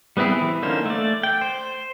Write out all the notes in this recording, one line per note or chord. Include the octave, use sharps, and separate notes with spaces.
G3 B3 C4 E4 G#4
E3
D3 A#3 C#4 D#4 C5
A3 D5
G5
C5